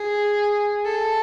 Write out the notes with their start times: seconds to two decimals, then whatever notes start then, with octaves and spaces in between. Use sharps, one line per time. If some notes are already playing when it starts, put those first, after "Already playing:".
Already playing: G#4
0.85 A4